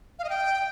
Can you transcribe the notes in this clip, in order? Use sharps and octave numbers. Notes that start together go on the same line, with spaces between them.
F5
D#5
G5